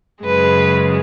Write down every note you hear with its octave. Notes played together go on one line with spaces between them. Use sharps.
F#2 C#3 G#3 B4